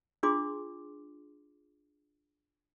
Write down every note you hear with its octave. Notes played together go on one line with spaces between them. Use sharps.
D4 F4 G#4 C6 D6